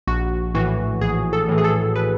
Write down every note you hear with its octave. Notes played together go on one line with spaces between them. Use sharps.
A#1 F#4
A2 E3 F#4
A#1 G#4
A4
A2 E3
G#4
A4
B4